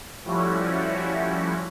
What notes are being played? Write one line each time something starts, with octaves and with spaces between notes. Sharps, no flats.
F3 G3 A3 C#4 E4 F#4